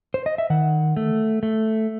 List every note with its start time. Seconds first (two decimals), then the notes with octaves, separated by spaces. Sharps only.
0.14 C5
0.26 D#5
0.38 E5
0.50 D#3 F#5
0.97 A3
1.43 A3